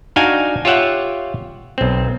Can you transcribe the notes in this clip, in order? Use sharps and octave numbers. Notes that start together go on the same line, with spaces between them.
D4 D#4 F#4 F5 G5 G#5
F4 G4 C#5 E5 F#5 G5
B1 C4